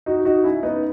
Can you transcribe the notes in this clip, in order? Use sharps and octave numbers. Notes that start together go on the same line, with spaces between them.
D#4 F#4
D#4 F#4
C#4 E4
B3 D#4